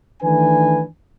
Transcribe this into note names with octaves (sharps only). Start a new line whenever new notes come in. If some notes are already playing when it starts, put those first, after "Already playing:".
D#3 E3 A3 D4 B4 G#5